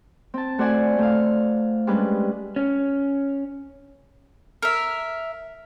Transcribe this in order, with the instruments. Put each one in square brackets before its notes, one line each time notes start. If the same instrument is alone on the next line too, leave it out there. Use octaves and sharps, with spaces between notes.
[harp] C4 A5
A3 F#4 C5 D5 F#5 G#5
A3 F5
G3 G#3 C#4 D4 B4
[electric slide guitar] C#4
[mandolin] A#4 E5